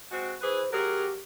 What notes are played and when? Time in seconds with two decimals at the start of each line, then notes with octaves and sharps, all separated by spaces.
0.11 G#3 C4 F#4
0.42 E3 G#4 B4 C5
0.72 F#3 G4 G#4 A#4